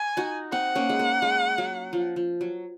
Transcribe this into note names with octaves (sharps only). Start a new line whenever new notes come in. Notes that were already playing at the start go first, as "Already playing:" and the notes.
Already playing: G#5
D#4 F#4
C4 D#4 F#5
A#3 C#4
G#3
A#3
G#3
F#3
F3
F3
F#3